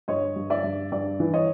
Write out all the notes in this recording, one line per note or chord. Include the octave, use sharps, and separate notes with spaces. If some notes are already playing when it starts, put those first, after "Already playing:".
G2 C#5 D#5
G2
D5 E5
G2
G2 D5
E3
C#5 D#5